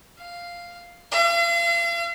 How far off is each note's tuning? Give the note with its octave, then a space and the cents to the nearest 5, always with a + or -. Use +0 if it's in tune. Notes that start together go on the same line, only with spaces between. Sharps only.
F5 +0
F5 -40